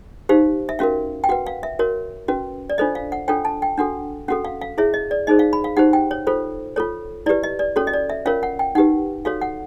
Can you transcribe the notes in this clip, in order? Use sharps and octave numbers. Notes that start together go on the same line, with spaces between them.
D#4 G4 C5 F5
E5
C#4 F#4 A#4 F5
G5
F#4 B4 F#5
F5
E5
F#4 A#4 C#5
C#4 F#4 B4
D5
D4 F4 A4 C5 D#5
F5
F#5
D4 F4 A4 C#5 G5
A5
G5
D4 F#4 A4 F#5
C#4 F#4 A4 F#5
F5
F5
E4 G#4 C#5 E5
D#5
D5
D#4 G#4 C5 D#5
F5
B5
F5
D#4 G4 C5 F#5
G5
C#5
F4 A4 C5
F4 A4 C#5
E4 G4 B4 D5
D#5
D5
C#4 F#4 A4 C#5
D#5
D5
E5
C#4 F4 A#4 C#5 F5
F#5
G5
D#4 G4 B4 F#5
F#4 A4 C#5 F5
F#5